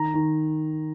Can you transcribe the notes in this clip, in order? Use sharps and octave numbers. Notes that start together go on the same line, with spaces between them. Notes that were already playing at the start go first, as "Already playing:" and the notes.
Already playing: D#3 A#5
D#3